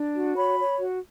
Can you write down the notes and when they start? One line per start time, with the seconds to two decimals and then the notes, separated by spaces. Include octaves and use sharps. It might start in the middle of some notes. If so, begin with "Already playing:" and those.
Already playing: D4
0.15 F#4
0.37 C#5 B5
0.58 C#5
0.80 F#4